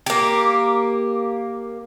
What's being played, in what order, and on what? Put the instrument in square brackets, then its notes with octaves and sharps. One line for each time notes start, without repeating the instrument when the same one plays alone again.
[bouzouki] A#3 G4